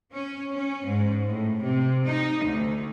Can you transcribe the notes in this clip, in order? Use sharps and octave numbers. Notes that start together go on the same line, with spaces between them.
C#4
C#4
G#2
A2
C3
D#4
D2